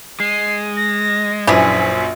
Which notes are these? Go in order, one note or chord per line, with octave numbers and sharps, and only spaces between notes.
G#3 C7
A#6
A#1 F#2 E3 D4 G#4 B6